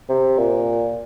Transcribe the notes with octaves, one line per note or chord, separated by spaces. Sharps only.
C3
A#2